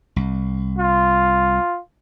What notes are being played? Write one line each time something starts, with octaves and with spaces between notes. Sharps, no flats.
C2
F4